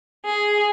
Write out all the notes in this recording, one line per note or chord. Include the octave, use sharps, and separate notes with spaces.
G#4